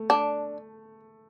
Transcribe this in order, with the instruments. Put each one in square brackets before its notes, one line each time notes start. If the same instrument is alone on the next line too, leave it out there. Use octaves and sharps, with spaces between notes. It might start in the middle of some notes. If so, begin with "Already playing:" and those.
Already playing: [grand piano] A3
[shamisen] D4